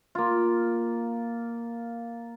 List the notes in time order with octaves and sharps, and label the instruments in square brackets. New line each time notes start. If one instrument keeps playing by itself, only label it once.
[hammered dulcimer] A#3 F4